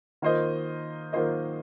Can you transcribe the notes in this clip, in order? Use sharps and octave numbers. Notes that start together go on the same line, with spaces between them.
D#3 A#3 F4 C5 D#5
D#3 A#3 F4 C5 D#5